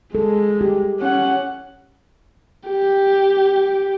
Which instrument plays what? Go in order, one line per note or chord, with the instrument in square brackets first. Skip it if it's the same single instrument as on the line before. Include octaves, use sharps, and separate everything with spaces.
[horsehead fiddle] G#3 [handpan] A4
[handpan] G4
[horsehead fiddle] C#4 F#5
[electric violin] G4